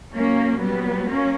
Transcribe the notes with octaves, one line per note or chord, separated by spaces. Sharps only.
A#2 F#3 A#3 C#4
G3 B3
A#3 C#4